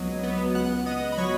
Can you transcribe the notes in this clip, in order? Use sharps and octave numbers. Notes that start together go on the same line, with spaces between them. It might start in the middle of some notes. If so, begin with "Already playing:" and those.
Already playing: C#2 F#3 B3 D#5 D#6
B3
C#2 F#5 F#6
B3 D#5 D#6
B5
F#3 C#5 C#6